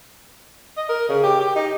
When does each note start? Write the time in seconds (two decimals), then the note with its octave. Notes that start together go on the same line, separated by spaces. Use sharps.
0.77 D#5
0.89 A#4
1.09 C#3
1.23 G4
1.40 G4
1.55 D#4